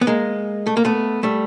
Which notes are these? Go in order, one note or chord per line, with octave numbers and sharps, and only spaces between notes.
B3
G#3 A#3
A3
A#3
A3 B3
G3 A3